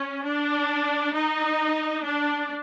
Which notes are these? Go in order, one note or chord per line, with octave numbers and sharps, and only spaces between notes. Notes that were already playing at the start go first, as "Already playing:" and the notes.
Already playing: C#4
D4
D#4
D4